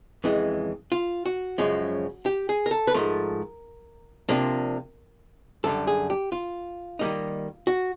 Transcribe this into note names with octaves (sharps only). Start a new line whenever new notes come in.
F2 C#3 E3 G#3
F4
F#4
F#2 C#3 F3 G#3 C#4
G4
G#4
A#4
A4
B4
G#2 F3 A3 A#4
C3 F3 A#3 D4
F#2 D3 G3 A4
G#4
G4
F4
D#3 G3 A#3 D#4
F#4